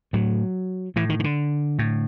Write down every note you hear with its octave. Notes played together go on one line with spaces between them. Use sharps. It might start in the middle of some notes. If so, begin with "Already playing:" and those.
A2 F#3
A2 E3
D#3
D#3
D3
A2